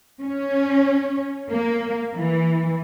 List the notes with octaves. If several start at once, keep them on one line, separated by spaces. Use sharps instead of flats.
C#4
A#3
E3